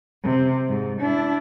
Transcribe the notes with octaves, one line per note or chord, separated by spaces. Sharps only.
C3
G#2
D4 E4